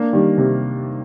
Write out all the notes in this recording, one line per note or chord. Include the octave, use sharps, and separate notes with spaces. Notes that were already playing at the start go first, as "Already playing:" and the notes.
Already playing: A#3 D4
D#3 G3
C3